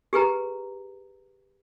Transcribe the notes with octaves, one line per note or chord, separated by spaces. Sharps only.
G4 G#4 B4 A#5